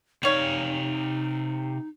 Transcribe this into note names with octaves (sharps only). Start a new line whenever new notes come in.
C3 G3 D#4 C#5 F5